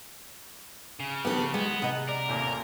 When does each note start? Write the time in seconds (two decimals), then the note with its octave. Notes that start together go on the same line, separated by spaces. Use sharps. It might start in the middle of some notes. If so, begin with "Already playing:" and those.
1.00 C#3
1.25 D#3 F3 B3 G4 A4
1.54 G#3 B3 G4
1.82 C3 G#4 D#5 F#5 B5
2.08 A#4 D5
2.28 A1 D#2 A#2